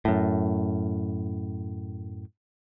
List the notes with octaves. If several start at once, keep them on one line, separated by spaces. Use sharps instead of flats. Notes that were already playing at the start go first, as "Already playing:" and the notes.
F#2 A2